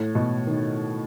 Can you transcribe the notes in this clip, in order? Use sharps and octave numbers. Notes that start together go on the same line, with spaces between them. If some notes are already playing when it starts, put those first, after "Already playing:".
Already playing: A2
B2
D#3